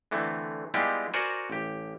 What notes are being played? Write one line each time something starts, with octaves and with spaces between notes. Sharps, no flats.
D3 E3 A3 C4
G3 G#3 B3 E4 F4 G4
F#4 A#4 C5 D5 F#5 G#5
A1 G4